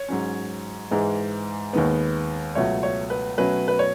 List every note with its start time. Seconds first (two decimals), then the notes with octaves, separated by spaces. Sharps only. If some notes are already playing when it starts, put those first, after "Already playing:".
Already playing: C#5
0.09 G#2 F#3 C#4
0.91 G#2 E3 G#3
1.73 D#2 D#3 G#3 B3
2.55 C#2 B2 F#3 A3 C#5
2.83 C#5
3.10 B4
3.38 B2 F#3 A3 C#4 B4
3.68 B4
3.79 C#5